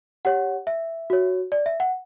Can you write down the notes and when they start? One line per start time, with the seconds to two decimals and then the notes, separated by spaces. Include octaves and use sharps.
0.25 G4 C#5 F#5
0.67 E5
1.10 F#4 C#5
1.52 D5
1.66 E5
1.80 F#5